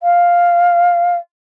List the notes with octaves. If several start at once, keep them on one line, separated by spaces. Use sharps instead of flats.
F5